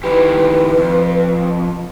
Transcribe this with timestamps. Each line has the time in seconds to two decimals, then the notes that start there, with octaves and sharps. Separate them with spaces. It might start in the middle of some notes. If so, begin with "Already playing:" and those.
0.04 D#3 E4 G4 B4
0.78 F2